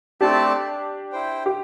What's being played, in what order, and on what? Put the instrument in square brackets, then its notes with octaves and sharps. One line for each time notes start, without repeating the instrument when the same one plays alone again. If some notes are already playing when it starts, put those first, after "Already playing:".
[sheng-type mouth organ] A3 C4 A4 D5 A5 [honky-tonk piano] D4 G4
[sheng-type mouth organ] E4 C5 G5
[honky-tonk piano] G4